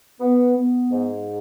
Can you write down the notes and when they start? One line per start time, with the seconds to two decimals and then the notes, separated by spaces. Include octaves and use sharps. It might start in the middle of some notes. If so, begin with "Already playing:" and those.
0.20 B3
0.56 B3
0.90 G#2